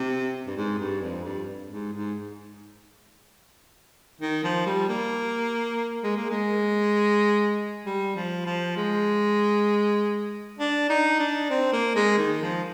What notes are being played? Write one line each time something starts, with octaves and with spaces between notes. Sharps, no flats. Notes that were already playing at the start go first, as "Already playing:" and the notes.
Already playing: C3
G2
G#2
G2
F2
G2
G#2
G#2
D#3
F3
G3
A#3
G#3
A#3
G#3
G3
F3
F3
G#3
D4
D#4
D4
C4
A#3
G#3
D#3
F3